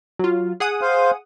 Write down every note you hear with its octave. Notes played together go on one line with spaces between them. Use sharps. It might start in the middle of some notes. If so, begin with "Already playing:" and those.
F#3 F4
G#4 F#5 D#6
C5 F5